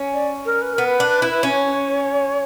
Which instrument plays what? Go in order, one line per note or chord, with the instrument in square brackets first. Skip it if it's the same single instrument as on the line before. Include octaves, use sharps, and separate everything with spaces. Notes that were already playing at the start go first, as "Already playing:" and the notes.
Already playing: [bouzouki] C#4
[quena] D5
A#4
B4
[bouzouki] B3 [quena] A#4
[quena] B4
[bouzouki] D4
E4
[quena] B4
[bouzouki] C#4 [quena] C#5